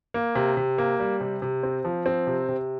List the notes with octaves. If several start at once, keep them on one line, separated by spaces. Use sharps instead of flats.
A#3
C3
C3
A#3
G3
C3
C3
C4
F3
C4
C3
C3